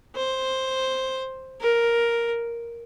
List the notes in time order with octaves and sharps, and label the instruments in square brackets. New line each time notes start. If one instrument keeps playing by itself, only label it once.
[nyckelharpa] C5
A#4